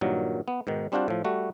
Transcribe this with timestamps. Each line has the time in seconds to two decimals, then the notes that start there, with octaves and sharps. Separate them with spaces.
0.01 G2 A#2 D#3 F#3
0.48 B3
0.67 G#2 B2 D#3
0.92 G3 C4 D4 F4 F#4 C5
1.08 A2 F3
1.24 G3 A3 F#4